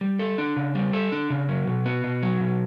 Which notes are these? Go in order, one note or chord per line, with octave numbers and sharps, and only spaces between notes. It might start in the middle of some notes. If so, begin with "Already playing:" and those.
G3
A4
D4
C#3
G3
A4
D4
C#3
F#3
B2
B3
B2
F#3
B2